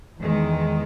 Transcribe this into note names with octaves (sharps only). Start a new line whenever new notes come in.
E2 D#3 G#3